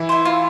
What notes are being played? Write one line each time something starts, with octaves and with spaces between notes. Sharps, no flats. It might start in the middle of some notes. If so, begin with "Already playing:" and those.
Already playing: E3 E4
C5 E5
F4